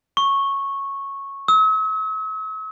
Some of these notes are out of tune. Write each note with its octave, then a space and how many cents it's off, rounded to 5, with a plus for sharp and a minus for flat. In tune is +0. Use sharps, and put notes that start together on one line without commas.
C#6 -10
E6 -45